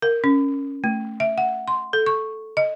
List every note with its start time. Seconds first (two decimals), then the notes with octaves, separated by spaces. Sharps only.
0.02 A#4
0.24 C#4
0.84 A3
1.20 E5
1.38 F#5
1.68 C6
1.93 A4
2.06 C#6
2.57 D#5